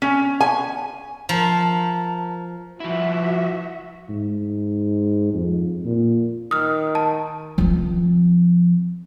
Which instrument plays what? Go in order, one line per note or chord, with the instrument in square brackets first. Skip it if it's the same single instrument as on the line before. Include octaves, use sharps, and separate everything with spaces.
[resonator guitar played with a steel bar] C#4
G#5
[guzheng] F3 [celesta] A#4 A5 A#5
[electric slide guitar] F3 E4 [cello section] F#4 E5
[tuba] G#2
F2
A#2
[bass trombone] D#3 [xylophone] D#6 F6
[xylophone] A5
[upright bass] F3 C4